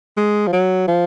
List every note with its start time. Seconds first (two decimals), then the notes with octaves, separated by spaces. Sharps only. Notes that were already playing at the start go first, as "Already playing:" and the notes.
0.17 G#3
0.47 F3
0.53 F#3
0.88 F3